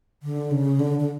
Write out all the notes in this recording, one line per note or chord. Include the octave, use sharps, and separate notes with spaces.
D3
C#3
D3
D3